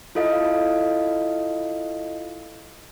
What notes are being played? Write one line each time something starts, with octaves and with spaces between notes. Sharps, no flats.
E4 F4 A4 D#5 F5